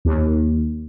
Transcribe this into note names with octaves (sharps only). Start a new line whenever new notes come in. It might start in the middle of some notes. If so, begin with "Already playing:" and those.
D#2